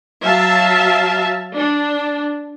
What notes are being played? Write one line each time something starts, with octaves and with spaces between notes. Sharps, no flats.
F#3 E5 F5 A5
D4